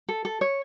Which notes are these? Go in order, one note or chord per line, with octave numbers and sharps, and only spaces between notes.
A4
A4
C#5